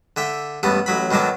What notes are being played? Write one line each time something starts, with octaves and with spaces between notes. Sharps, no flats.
D3 E5 G5
A1 G2 B3 A4
A1 F#3 B5
B2 D#3 F#3 D4 A4